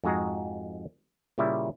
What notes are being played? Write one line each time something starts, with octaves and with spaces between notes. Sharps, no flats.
F2 G#2 G#3 F#4 G#4 A#5
A#2 C#3 G3 E4 E5